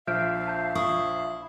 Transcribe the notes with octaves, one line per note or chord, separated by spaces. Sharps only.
A#1 F3 E5 F5 F6 G6 D7
A5 G6
E4 C#6 D#6